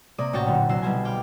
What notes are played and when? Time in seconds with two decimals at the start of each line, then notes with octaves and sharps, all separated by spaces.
0.18 C3 A#3 D5 D#6
0.33 A1 F#4 C#5 G5 C#6 A6
0.46 F#1 A#2 D3
0.69 C2 F#3 E6 C7
0.82 B1 B2 G3 C5 G#5
1.05 F5 G5 D6